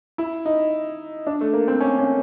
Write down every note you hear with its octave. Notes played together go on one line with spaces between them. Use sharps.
E4
D#4
D4
A3
A#3
C4
C#4
C#4